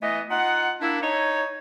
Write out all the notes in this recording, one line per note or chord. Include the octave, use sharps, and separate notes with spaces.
E3 A3 B3 D#5
D#4 F4 F#5
A#3 D4 E4
D#4 C#5